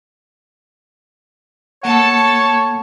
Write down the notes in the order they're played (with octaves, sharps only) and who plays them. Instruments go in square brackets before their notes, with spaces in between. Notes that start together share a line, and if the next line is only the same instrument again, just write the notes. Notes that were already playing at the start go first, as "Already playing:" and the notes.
[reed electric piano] A#3 F#5 [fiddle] A4 A5 [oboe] C#5